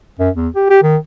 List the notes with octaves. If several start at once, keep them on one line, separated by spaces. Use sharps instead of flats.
F#2
E2
G4
G4
D#3